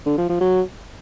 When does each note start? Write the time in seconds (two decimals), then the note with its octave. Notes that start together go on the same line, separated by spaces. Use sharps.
0.06 D3
0.17 F3
0.29 F3
0.41 F#3